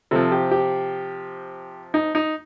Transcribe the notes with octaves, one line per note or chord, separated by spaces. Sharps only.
C3 F3 A4
G4
G4
D#4
D#4